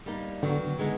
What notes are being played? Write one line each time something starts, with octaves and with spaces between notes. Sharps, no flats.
G3 A#3 D#4
D3 D#3 F#3 B3
E3 G#3 B3 D#4